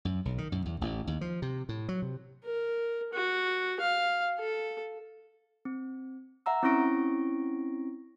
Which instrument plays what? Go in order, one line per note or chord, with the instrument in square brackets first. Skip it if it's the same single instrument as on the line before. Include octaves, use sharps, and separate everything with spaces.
[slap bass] F#2
B1
D#3
F#2
E2
A1
D#2
F3
C3
A2
F#3
C3
[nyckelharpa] A#4
F#4
F5
A4
[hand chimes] C4
E5 F#5 A#5 E6
C4 C#4 E4 C#6 A#6 D7